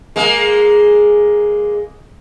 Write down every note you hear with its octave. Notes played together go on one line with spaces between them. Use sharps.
G#3 A#3